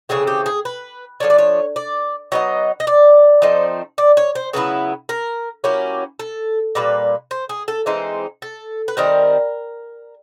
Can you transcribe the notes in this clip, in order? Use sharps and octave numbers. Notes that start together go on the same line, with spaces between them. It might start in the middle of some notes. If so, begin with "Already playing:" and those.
C#3 E3 A3 C4 G#4
G4
G#4
B4
F3 A3 D4 C#5
D5
C#5
D5
F#3 B3 D#4 D#5
D#5
D5
F3 A3 C4 D#4
D5
C#5
C5
C#3 F#3 B3 E4 B4
A#4
F#3 A#3 C#4 E4 G4
A4
A#2 G3 A#3 B4
C5
G#4
A4
E3 G#3 C4 D#4
A4
B4
D#3 G3 C4 A#4